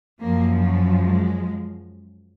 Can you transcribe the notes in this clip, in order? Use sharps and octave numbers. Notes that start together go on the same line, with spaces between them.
F#2 F3 A#3
G#3